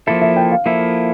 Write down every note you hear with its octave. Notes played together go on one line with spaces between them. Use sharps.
F3 A#3 E4 A4 E5
E5
G5
F5
F3 A#3 E4 A4 E5